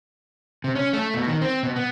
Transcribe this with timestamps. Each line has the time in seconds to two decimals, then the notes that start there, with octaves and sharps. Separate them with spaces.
0.64 C3
0.75 C#4
0.93 A3
1.14 B2
1.27 D#3
1.41 C4
1.63 B2
1.76 B3